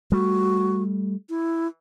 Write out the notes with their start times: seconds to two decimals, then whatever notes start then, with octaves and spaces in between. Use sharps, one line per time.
0.12 G3 A3 F#4
1.30 E4